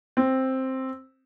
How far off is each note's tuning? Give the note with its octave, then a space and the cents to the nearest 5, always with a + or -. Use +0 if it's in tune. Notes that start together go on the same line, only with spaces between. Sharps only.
C4 +5